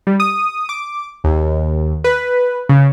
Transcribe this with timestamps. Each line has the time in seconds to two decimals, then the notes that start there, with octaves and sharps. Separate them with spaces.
0.07 G3
0.20 D#6
0.69 D6
1.24 D#2
2.04 B4
2.69 C#3